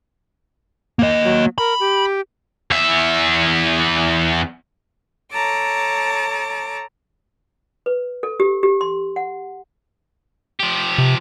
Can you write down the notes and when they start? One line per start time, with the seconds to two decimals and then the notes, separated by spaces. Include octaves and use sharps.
0.99 A#3 D#5
1.24 F#3
1.58 A#4 B5
1.80 G4
2.71 E2 E5
5.32 A4 C#5 A5 A#5 D6
7.86 B4
8.23 A4
8.40 G4
8.63 G4
8.81 C6
9.16 F#5
10.60 F3 G4
10.98 C3